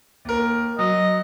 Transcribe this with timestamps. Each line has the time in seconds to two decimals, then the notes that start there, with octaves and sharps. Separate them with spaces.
0.25 D#2 A#4
0.79 F#3 D#5